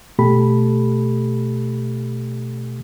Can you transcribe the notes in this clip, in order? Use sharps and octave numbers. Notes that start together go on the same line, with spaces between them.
B2 A3 G4 A4 B5